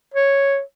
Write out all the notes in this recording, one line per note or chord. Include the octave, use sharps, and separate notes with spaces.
C#5